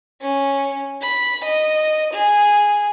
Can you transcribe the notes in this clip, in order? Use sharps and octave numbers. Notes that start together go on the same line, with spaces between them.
C#4
B5
D#5
G#4